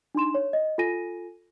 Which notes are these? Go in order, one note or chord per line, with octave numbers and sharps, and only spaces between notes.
D4 D#4 C6 E7
C#5
D#5
F4 A4 G#5 A#6 D#7